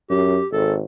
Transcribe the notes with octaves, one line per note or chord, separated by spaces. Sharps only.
F#2 G4
G#1 A4